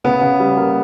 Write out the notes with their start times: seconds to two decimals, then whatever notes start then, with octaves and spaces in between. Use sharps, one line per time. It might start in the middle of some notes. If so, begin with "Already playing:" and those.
0.04 C#3 B3
0.21 C#3
0.40 G3
0.57 A#3